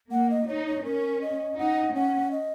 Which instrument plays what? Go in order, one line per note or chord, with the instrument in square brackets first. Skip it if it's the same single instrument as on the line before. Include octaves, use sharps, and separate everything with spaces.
[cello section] A#3 [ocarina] F#5
[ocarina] D#5
[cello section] D#4 [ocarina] C#5
[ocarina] C#5
[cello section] C#4 [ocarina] A#4
[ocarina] D#5
[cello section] D#4 [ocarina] F#5
[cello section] C#4 [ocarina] F#5
[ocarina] D#5